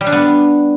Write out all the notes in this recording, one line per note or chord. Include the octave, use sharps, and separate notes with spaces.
G3
D4
B3